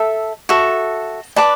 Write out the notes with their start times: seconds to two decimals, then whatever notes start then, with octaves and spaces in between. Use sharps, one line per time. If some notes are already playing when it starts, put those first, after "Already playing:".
Already playing: A4 E5
0.49 F#4 A4 E5
1.36 B4 D5 A5 D6